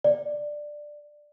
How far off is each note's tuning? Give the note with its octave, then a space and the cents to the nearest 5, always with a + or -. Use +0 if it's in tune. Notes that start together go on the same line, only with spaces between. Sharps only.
D5 +10